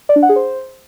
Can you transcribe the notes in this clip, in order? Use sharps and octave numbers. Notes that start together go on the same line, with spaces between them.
D5
D4
F#5
G#4
C5